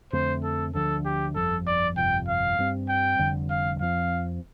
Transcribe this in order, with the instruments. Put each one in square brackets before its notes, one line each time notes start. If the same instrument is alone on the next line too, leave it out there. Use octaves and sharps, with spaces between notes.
[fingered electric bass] F2 D3 A3 C4 [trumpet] C5
[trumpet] A4
[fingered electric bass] D2 D3 F3 D4 [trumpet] A4
[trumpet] G4
[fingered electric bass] G1 F2 F3 [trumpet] A4
[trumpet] D5
[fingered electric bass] G1 F2 C3 [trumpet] G5
[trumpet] F5
[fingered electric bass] G2 G3 C4
[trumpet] G5
[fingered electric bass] F1 F2 D3 G3
[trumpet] F5
[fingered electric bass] F2 F3 C4 [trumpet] F5